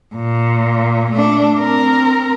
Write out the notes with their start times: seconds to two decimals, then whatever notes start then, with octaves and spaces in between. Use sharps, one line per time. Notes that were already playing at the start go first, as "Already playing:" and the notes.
0.15 A#2
1.11 A3 D4
1.59 C4 A#4